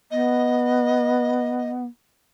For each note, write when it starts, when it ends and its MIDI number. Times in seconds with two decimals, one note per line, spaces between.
0.11 1.85 59
0.11 1.71 75